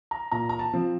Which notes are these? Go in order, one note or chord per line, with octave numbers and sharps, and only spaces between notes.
A#5
A#2 A#5
A#5
A5
F3 C4